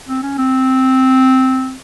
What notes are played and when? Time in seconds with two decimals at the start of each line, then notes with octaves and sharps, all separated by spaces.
0.09 C4
0.23 C#4
0.38 C4